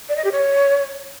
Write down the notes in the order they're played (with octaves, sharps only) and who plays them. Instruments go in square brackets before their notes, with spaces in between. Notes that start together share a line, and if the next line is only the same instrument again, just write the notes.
[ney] D5
D#5
G4
C#5